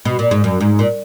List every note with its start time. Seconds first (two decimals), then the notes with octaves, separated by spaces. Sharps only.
0.05 B2
0.19 A#2
0.31 G#2
0.44 F#2
0.61 G#2
0.79 A#2